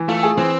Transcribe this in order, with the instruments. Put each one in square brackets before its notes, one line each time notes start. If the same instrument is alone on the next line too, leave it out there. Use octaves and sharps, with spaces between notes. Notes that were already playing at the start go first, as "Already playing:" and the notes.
Already playing: [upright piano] E3
[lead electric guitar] A3 [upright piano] F4
[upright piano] G#4
[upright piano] E3 [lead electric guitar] C4